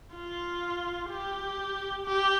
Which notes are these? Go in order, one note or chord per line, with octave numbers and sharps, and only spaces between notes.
F4
G4
G4